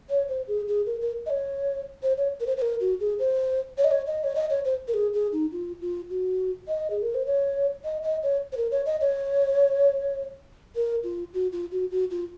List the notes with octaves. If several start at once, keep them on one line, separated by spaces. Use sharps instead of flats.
C#5
C5
G#4
G#4
A#4
A#4
D#5
C#5
C5
C#5
A#4
C5
C5
A#4
F#4
G#4
C5
C#5
D#5
C#5
D#5
C#5
D#5
C#5
C5
A#4
G#4
G#4
D#4
F4
F4
F#4
D#5
G#4
A#4
C5
C#5
D#5
D#5
C#5
C5
A#4
C#5
D#5
C#5
A#4
F4
F#4
F4
F#4
F#4
F4